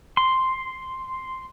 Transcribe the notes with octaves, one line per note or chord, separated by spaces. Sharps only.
C6